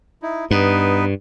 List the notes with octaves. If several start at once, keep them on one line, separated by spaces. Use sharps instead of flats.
D#4 E4
G2 B3 D#4 B4